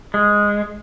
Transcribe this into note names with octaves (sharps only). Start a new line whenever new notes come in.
G#3